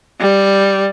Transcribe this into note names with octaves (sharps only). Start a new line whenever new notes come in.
G3